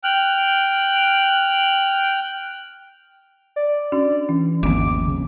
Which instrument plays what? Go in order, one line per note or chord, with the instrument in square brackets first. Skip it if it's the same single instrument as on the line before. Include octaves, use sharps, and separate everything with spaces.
[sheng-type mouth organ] G5 F6 F#6
[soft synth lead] D5
[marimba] C#4 D4 F#4
[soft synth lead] E3 [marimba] C#4
[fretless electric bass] G1 D#2 [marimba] F3 A#3 C4 [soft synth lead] D6
[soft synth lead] C#3